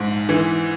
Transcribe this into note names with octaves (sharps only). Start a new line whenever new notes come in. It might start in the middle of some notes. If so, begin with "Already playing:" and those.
Already playing: A#1 G#2
E3